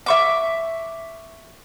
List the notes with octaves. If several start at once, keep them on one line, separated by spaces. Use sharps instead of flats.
E5 C#6 D6